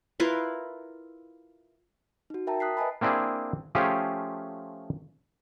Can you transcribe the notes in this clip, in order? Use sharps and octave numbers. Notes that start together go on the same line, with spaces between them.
E4 F4 A#4 B4
D#4 F#4
A#4 E5 G5 A5 A#5
D#6 F#6 B6 C7
B4 D#5 E5 G#5 A5 B5
A#3 C4 D4 E4 G#4
F3 A3 C#4 F4 G4 G#4